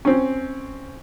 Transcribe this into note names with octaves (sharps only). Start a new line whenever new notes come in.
C4 C#4